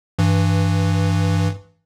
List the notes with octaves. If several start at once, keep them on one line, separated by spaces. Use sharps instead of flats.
G2 E3